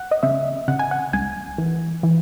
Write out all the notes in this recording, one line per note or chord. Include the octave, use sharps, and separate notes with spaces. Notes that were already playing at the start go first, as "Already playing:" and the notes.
Already playing: F#5
D#5
C#3 E5
C#3 F#5
G#5
F#5
C#2 G#5
E3
E3